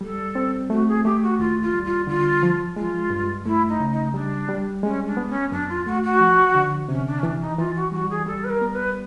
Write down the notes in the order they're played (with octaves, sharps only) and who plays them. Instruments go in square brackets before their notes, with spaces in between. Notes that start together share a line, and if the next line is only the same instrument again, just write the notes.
[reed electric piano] G3 [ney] A4
[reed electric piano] C4
[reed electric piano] A3 [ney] F#4
[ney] G#4
[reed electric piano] A3 [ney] G4
[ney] F#4
[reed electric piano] D#2 [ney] F4
[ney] F4
[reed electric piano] G3
[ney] F4
[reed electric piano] D3 [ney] F4
[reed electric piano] F3
[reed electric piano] G#3 [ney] F4
[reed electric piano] G2
[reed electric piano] A3 [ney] E4
[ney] D#4
[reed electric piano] C#3
[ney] D#4
[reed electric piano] G3 [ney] D4
[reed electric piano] G3
[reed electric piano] G#3 [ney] C#4
[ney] D4
[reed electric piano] B3
[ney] C#4
[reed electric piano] F#2 [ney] D4
[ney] F4
[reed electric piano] A3 [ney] F#4
[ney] F#4
[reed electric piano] F3
D3
[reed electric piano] C3 [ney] C#4
[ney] D4
C#4
[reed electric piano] E3 [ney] D4
[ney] D#4
[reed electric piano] E3 [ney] F4
[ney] F#4
[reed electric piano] G3 [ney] F#4
[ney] G#4
[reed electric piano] G3 [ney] A4
[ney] B4
A#4
[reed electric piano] B3
[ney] B4